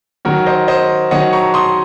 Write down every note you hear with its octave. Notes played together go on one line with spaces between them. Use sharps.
D#3 F#3 C#4 F#4 A#4
C5 D#5
C5 D#5
D#3 F#3 C#4 D#5 F#5
A#5 C#6
C6 D#6